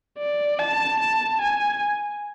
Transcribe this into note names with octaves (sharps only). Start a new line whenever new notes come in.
D5
A5
A5
G#5